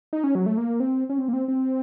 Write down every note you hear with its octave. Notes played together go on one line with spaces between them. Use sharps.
D#4
C#4
F#3
A3
A#3
C4
C#4
C4
A#3
C4
C4